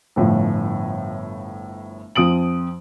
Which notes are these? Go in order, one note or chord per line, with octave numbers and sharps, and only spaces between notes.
G1 A2 F3
F2 F3 D#6 D7 F#7